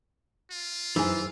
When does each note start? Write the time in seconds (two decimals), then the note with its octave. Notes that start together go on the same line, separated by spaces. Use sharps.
0.51 F4
0.96 F#2 E3 D#4 G#4 C5 E6